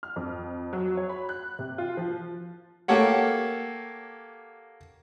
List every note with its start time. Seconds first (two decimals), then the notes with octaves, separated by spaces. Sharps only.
0.03 F6
0.16 F2
0.73 F#3
0.97 C#5
1.09 B5
1.29 F#6
1.59 C3
1.78 F4
1.97 F3
2.88 A#3 G4 A4 C#5 F#5